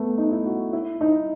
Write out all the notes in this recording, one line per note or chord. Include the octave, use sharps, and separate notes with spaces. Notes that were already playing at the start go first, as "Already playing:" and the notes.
Already playing: A3 B3
D#4
E4
F#4
E4
D#4